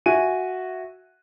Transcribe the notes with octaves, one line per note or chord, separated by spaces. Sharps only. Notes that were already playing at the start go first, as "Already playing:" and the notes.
F#4 E5 G#5 D#7